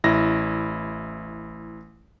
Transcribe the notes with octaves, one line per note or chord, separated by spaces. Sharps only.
A1 E4 A#6